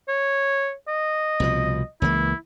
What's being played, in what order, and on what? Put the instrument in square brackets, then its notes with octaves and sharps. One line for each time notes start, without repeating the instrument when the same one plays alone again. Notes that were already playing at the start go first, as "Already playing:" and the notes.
[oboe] C#5
D#5
[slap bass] C2 B2 F3
[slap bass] C#2 E3 A#3 [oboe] E4